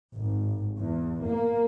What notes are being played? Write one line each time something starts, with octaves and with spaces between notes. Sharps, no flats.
G#1
E2
A#3